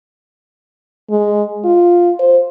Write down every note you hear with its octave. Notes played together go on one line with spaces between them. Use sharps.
G#3
F4
C5